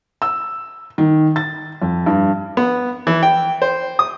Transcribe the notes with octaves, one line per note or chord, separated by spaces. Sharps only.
E6
D#3
A6
F2
G2
B3
E3
G5
C5
D#6